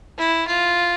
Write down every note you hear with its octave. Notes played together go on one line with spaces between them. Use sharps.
E4
F4